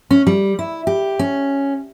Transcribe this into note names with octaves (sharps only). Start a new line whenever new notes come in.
C#4
G3
E4
G4
C#4